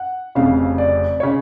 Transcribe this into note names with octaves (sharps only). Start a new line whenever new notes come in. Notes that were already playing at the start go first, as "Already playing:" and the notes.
Already playing: F#5
F1 F2 C#3 F5
D5
C#3 C#5